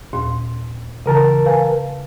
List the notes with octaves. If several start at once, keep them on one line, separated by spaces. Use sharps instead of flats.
D#2 A#2 C6
C#3 E3 A#4 A5
B4 F5 G#5